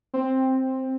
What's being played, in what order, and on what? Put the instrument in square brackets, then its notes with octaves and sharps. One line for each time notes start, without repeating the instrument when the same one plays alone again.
[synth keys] C4